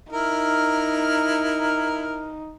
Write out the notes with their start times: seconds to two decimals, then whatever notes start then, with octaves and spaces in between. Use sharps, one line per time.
0.13 D#4 E4 A#4 F6